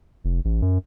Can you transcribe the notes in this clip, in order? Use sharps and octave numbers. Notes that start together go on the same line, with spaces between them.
F1
A1
F#2